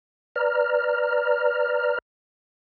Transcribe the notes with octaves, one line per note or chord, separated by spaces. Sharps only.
B4 D5 A#5 F6